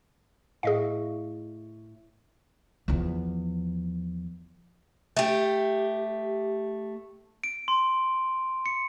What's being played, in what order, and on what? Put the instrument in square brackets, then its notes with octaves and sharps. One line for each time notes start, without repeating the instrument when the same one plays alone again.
[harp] A2 [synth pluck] G#4 D#5 F5
[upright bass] E2 F3
[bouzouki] A3 G4
[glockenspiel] D7
C6
C#7